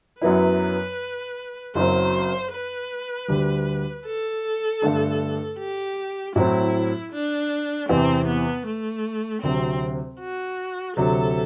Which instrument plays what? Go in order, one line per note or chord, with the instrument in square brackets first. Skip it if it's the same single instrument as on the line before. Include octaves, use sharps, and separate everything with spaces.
[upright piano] F#2 F#3 B3 E4 [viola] B4
[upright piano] F#1 F#2 F#3 C4 [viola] C5
[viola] B4
[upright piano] D2 D3 G3
[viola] A4
[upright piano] G2 D3 A3 D4
[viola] G4
[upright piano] A2 F#3 C4 [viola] E4
[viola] D4
[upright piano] E2 C3 E3 [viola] C4
[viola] B3
A3
[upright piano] D2 C3 F#3 [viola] C4
[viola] F#4
[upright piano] D2 C3 F#3 [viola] A4